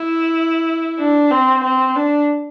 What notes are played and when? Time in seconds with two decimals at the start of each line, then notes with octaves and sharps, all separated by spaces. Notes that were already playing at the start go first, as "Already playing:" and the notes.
Already playing: E4
0.99 D4
1.31 C4
1.63 C4
1.96 D4